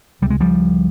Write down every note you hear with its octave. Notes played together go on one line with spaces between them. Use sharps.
C#2 C3 G3
G#3
F3 G3